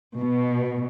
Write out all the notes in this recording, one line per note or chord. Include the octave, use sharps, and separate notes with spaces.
B2